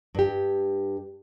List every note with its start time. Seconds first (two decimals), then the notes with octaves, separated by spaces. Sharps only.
0.15 G2 G4